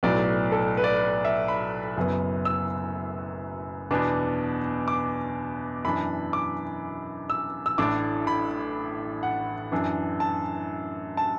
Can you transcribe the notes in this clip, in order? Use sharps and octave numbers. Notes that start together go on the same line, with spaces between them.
B1 A2 F#3 B3 D5
A4
B4
D5
E5
B5
F#1 F#2 F#3 B3
E6
E2 B2 B3 D4
D6
F#2 E3 D4 B5
D6
E6
E6
A1 A2 A3 D4 D6
B5
F#5
F#2 E3 D4
A5
A5